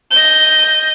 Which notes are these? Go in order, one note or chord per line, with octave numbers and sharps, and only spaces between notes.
D#5 G6